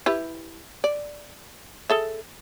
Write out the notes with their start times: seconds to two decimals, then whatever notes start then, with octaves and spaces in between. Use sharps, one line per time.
0.06 E4 G4 B4
0.84 D5
1.90 G#4 A4 E5